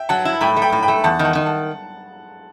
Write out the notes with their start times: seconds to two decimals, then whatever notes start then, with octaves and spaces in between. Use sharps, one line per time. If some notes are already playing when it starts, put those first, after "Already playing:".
Already playing: E5 G5
0.09 F#3 F#5 A5
0.25 E4
0.41 A2 G5 B5
0.57 A3
0.62 G5 B5
0.72 A2
0.82 G5 B5
0.88 A3
1.04 E2 F#5 A5
1.19 D#3
1.25 F#5 A5
1.35 D#3
1.46 F#5 A5